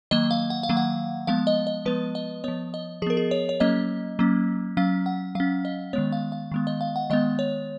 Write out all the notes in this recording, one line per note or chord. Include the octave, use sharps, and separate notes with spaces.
D#3 F#3 A#3 D#5
F5
F#5
F5
D#3 F#3 A#3
F#5
F3 G#3 B3 F5
D#5
D#5
F3 G#3 B3 B4
D#5
F3 B3 C#5
D#5
F3 B3 G#4 A#4
G#4
C#5
C#5
F#3 A#3 C#4 D#5
F#3 A#3 C#4
F#3 C#4 F5
F#5
F#3 C#4 F5
D#5
D#3 G#3 B3 C#5
F5
F5
D#3 G#3 B3
D#5
F5
F#5
D#3 G#3 B3 D#5
C#5